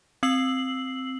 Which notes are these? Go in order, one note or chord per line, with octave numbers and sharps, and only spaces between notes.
C4 E6 C7 F#7